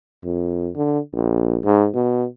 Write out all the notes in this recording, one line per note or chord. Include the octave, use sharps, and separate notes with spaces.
F2
D3
A#1
G#2
B2